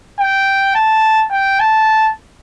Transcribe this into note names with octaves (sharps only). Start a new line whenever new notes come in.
G5
A5
G5
A5